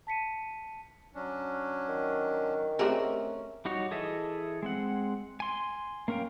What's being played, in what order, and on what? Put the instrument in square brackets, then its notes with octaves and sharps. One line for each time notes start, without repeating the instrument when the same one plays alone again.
[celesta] A5 B6 C#7 D#7
[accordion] F#3 C#4 D4
[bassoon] D#3
[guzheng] A3 A#4 F#5 [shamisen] C4 G4 G#4 [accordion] C#4
[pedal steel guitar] G3 D#4 F#4 C#5
E3 G#4 A4 D#5 E5
G#3 C4 F#5
G#5 C6
A#3 C#4 A#4 F5 G5